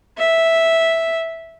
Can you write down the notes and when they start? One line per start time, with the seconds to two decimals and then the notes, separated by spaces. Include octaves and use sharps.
0.18 E5